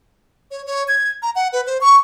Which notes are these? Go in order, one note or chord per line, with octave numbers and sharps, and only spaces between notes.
C#5
C#5
G#6
A#5
F#5
B4
C5
C#6